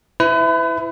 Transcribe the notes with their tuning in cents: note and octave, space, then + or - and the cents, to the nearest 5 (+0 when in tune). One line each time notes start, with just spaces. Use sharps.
E4 +0 B4 +35